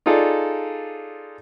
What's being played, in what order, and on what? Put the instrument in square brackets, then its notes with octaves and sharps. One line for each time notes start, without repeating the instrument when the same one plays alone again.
[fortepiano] D#4 F4 G#4 A4 D5